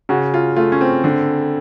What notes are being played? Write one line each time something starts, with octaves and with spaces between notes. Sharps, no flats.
C#3 F#4
F4
A3 F4
C#4
C4
D3